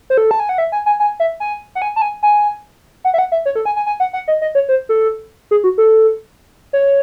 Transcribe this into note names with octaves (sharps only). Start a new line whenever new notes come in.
C5
A4
A5
G#5
F#5
E5
G#5
G#5
G#5
E5
G#5
F#5
G#5
A5
G#5
G#5
F#5
E5
F#5
E5
C#5
A4
G#5
G#5
G#5
F#5
F#5
D#5
D#5
C#5
C5
A4
G#4
F#4
A4
C#5